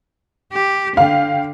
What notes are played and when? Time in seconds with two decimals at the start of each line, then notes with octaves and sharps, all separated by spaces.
0.53 G4
0.97 D3 F5 G5